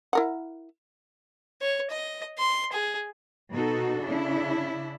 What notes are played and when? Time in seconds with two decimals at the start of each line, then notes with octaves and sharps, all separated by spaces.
0.13 E4 A#4 F#5
1.62 C#5
1.91 D#5
2.38 C6
2.72 G#4
3.54 B2 D#4 F#4 A4
4.05 C#3 D4 E4